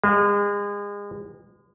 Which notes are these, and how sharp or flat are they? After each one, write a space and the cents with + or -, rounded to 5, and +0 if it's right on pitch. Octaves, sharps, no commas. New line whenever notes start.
G#3 -35